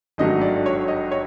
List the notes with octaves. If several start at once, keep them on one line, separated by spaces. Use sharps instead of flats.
G#1 G2 D#3 F#3 A3 D#5
D5
C#5
D#5
C#5